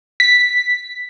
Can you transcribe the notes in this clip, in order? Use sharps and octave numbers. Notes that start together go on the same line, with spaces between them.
B6